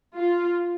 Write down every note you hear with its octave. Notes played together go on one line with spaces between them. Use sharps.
F4